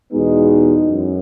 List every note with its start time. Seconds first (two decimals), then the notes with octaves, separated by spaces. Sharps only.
0.12 E2 B2 G#3 B3 D#4
0.91 F#2